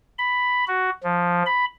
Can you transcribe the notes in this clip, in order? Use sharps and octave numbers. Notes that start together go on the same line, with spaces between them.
B5
F#4
F3
B5